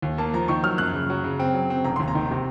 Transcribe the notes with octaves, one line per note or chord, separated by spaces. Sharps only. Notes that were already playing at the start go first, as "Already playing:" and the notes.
D#2
A#3 A5
F3 A#5
D#3 C#6
F#3 F6
F#2 F#6
C#3
F#3
C#3
C4
F#3
C4
F1 A#5
C6
D#2
A#5
D#3
C3